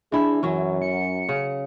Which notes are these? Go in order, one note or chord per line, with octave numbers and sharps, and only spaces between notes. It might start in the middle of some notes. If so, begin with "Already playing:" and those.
E3 D4 E4 G#4
F#2 E3 F#3 C#4
C#7
C#3